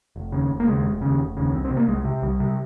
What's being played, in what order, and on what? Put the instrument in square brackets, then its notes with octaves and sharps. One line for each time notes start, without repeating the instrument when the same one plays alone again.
[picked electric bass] F1
D#2 C#3
F1
A#3
D#2 C#3 G#3
F1
D#2 C#3
F1
D#2 C#3
C2 C4
C4
C3
A#3
C2 G#3
C3
C2 G3
C3